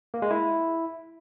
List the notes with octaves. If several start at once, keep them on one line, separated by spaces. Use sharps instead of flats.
A#3
G#3
E4